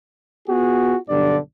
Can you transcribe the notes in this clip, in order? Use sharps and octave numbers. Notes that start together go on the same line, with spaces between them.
B3 F4 F#4 G#4
B1 G2 D3 D5